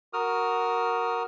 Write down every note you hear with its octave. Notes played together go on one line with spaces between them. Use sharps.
F#4 A#4 D#6 F6